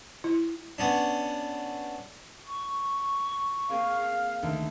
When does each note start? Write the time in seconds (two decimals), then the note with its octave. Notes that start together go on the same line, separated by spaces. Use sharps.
0.24 E4
0.78 B3 C#4 D4
2.46 C#6
3.70 A#3 C4 G#4 F5
4.43 D2 D#3 A3